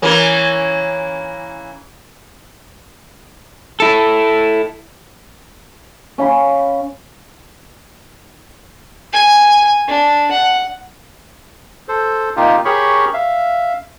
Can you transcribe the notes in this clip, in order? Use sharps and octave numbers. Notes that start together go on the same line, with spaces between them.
E3 A#3 C#4
E4 A4
C#4 F5 B5 C6
G#5
D4
F#5
A4 C5
C3 A#3 D#4 F4 G4
G4 G#4 A#4 C#5 B5 C#6
E5 F5